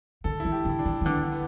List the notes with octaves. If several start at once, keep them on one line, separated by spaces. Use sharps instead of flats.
D3 A4
E4
E3
G4
D3
E4
D4
E3
E3
D3 B3
B3